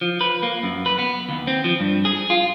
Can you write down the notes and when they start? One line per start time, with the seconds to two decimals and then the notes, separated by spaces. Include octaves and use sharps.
0.01 F3
0.21 B4
0.43 A#3
0.63 F#2
0.86 B4
0.98 B3
1.29 D#2
1.47 C4
1.64 F3
1.80 G2
2.05 G#4
2.30 F4